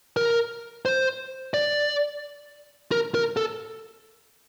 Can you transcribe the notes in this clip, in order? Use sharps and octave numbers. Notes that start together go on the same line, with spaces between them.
A#4
C5
D5
A#4
A#4
A4